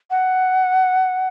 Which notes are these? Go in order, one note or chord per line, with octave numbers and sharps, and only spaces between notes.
F#5